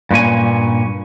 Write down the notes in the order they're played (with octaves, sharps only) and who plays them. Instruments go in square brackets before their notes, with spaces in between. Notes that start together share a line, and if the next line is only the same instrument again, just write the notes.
[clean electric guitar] G2 A#2 C#4 G#5